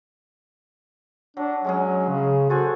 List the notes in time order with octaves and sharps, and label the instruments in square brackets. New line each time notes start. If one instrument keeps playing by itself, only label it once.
[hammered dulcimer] F#3 [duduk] D4
[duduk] F#3 [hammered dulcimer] G#3 C#4 G#4
[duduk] C#3
[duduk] F#4 [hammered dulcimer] A4 C5 G#5